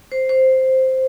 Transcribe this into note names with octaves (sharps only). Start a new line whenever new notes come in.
C5
C5